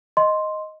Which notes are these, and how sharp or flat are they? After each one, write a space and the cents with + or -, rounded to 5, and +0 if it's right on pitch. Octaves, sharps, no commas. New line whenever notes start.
D#5 +0 C6 +0